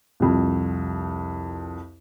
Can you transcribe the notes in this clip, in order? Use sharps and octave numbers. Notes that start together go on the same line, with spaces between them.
C2 F2